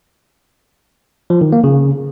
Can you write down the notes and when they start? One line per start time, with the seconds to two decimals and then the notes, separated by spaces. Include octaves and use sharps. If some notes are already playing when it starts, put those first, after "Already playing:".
1.30 F3
1.41 D#3
1.52 A#3
1.64 C#3